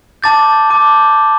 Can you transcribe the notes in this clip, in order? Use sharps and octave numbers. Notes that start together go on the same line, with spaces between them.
A5 D6 G6 A6
A5 D6 G6